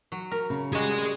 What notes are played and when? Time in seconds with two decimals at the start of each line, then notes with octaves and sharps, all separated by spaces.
0.12 F#3
0.31 A#4
0.50 C#3
0.73 G3 F#4 G#4 D#5